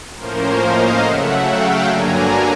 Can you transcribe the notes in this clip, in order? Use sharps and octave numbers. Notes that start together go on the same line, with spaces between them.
A2 F3 A#3 C#4 A#4 C5
D#5 F5
C#3 F#3 A3 E5 F#5
F5 G5
G2 D3 F#3 A#3 D4 G#5 A#5